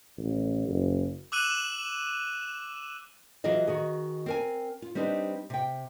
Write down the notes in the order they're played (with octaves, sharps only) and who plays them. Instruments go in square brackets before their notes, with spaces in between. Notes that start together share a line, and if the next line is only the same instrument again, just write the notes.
[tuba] A1
F#1
[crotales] D6 E6 F#6 D#7 E7 F#7
[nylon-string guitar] E3 F#3 F4 G#4 D#5
D#3 F#4 G#4
C4 A#4 G#5
F4
G3 C4 D4 D#4 B4
C3 G5